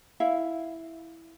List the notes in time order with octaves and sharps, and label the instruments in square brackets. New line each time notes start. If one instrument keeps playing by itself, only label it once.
[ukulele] E4 E5 F5